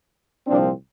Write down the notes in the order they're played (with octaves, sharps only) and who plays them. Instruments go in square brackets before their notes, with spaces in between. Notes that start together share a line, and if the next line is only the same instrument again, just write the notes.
[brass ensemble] C2 A#2 F3 C4 D4